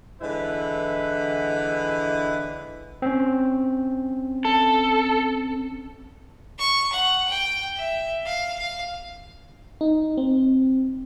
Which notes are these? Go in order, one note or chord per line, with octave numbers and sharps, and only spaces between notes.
D3 E3 G#3 E4 B4
C4 C#4
A4
C#6
F#5
G5
E5
F5
F5
D#4
C4